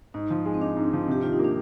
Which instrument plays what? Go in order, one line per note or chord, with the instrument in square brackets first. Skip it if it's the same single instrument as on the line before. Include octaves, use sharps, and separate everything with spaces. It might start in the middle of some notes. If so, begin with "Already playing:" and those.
[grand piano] G#2 [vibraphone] D#4
[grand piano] F3
G#3
[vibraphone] C4
[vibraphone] D4 [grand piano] D#4
[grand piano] G#2
F3
[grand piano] C3 [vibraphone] G4
[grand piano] D#3 [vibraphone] F4
[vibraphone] D#4
[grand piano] A#3
[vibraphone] D4